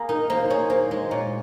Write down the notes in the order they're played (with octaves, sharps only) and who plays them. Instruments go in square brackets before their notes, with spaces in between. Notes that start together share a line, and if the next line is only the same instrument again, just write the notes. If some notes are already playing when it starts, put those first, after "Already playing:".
Already playing: [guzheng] A#3 G#4
[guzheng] D#4 [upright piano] A#4
[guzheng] A#3 [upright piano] C5
[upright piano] C5
[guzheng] G#4 [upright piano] C#5
[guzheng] A#3 [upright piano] C5
[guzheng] G#3 [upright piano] C5
[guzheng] A#2 [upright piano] C#5